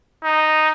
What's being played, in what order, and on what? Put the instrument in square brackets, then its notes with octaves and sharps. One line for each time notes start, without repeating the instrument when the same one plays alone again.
[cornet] D#4